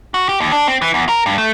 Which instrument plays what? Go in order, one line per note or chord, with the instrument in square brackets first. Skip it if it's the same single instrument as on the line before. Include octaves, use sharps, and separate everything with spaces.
[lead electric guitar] F#4
G4
D#2
D4
C4
E3
E2
A#4
G2
A3